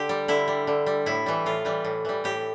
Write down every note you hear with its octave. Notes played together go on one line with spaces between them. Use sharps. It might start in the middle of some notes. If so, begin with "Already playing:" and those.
Already playing: D3 G4
G3
D3 E4
G3
D3
G3
A2 E4
E3 G3
A2 F4
E3 G3
A2
E3 G3
A2 G4